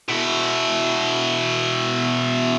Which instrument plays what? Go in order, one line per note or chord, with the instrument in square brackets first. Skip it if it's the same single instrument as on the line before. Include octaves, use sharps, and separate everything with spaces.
[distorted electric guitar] B2 E4